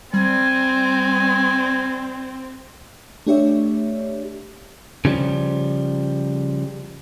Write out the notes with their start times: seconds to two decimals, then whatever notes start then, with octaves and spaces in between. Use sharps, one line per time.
0.14 G3 C4 G#5
3.27 A3 D4 G4 C#5 D5 E5
5.05 C#3 F3 G3